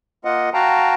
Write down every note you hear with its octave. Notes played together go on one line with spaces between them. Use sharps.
A#3 F4 D#5 F#5
F#4 F5 G5 A5 A#5